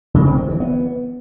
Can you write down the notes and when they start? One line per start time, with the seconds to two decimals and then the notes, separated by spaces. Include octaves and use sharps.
0.14 C#3
0.26 C4
0.37 D#3
0.49 E3
0.60 B3